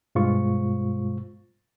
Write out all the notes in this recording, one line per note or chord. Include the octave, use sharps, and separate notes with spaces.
G2 B2 G#3 F4 C5 C#6